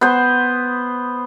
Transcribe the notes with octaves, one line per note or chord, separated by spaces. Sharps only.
B3 C5